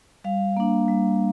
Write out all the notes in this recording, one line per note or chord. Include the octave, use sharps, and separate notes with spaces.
G3 F5
A#3 D4
G3